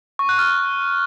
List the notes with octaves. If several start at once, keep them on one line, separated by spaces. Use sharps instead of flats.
C#6
F#6
F6